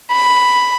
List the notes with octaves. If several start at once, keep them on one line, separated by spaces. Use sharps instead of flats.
B5